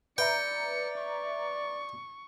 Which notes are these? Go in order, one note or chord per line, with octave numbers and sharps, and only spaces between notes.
B4 D5 E5 G5 A#5 C#7
C#6